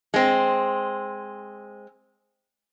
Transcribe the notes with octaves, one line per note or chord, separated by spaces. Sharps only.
G#3 C4